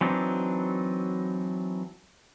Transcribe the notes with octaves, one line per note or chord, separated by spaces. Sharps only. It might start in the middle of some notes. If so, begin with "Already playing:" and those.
E3 F#3 C4 D4 D#4